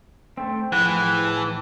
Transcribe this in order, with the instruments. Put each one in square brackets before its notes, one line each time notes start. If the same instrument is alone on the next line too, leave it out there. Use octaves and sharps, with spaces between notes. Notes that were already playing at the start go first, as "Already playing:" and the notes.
[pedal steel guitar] A3 C4 [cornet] G5
[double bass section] A2 F3 [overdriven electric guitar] E3 [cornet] G#4 [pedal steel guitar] F#5 G5
[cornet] A5